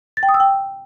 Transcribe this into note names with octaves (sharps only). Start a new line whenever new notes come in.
A6
G5
D#6
E6
G5